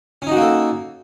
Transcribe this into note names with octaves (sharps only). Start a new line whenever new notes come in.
A#3 C#4 D#4 F#4 A4